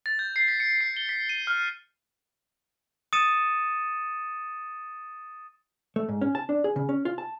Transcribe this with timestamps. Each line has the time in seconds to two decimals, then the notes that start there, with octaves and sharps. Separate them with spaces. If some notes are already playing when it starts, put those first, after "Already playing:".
0.06 A6
0.19 G6
0.36 C7
0.48 B6
0.60 C#7
0.81 C7
0.97 G7
1.09 B6
1.29 D#7
1.47 F6
3.13 D#6 A6 C#7 D#7 E7
5.96 A3
6.09 G#2
6.21 C#4
6.35 A5
6.49 D4
6.64 G#4
6.76 C#3
6.89 C#4
7.05 F4
7.18 A5